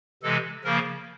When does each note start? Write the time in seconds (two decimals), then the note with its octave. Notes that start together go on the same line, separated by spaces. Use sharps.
0.23 C3 E3 G#3 A4
0.65 C#3 F3 A#3 A#4